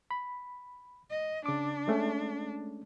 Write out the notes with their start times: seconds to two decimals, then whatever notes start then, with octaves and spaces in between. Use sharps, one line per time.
0.11 B5
1.10 D#5
1.46 C#3 D4 D6
1.88 G#3 A3 C#4